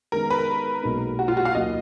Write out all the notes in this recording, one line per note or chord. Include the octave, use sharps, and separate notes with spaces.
D#3 G#3 B3 D#4 A#4
B4
A#4
B1 A#2 G#3 D#4
F#4
F4
F#4
F5
D#2 D#3 F#3 A#3 D#5